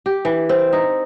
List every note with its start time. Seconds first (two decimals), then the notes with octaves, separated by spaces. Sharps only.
0.06 G4
0.25 E3
0.49 C4
0.73 D#4